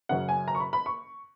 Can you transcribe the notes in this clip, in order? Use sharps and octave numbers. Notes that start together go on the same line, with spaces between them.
F#2 C#3 F#3 C#4 F#5
G#5
A#5
C#6
B5
B5
C#6